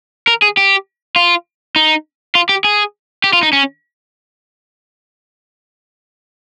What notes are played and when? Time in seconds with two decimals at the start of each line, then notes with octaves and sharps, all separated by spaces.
0.28 A#4
0.42 G#4
0.57 G4
1.16 F4
1.76 D#4
2.35 F4
2.49 G4
2.64 G#4
3.24 G4
3.33 F4
3.43 D#4
3.53 C#4